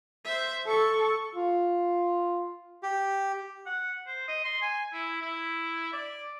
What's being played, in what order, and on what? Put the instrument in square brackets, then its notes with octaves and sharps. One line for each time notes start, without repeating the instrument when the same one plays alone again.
[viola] C5 E5
[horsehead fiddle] A4 [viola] C#6
[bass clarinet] F4
[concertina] G4
[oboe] F#5
C5
D#5
C6
G#5
E4
E4
D5